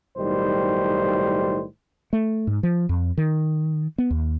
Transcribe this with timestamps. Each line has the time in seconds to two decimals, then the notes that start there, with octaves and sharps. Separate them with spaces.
0.16 B1 A2 D#3 G3 C5
2.13 A3
2.47 G#2
2.63 F3
2.89 F2
3.18 D#3
3.98 B3
4.11 D#2